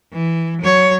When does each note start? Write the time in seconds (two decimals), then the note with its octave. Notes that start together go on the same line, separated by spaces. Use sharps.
0.13 E3
0.61 F#3 C#5